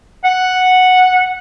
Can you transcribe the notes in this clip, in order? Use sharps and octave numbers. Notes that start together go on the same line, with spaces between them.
F#5